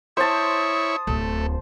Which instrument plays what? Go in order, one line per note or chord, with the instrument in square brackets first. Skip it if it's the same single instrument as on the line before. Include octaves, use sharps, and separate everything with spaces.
[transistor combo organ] E4 C#5 [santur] C5 A5 [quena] D#6
[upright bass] D1 D2 [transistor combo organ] A3